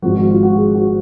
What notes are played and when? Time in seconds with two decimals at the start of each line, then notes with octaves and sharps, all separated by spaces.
0.02 G#1 G#2 F3 F#4
0.16 F#4
0.30 F4
0.43 F#4
0.57 G#4
0.75 F#4